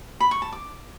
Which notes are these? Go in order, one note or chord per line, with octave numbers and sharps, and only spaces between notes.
B5
C#6
A5
D6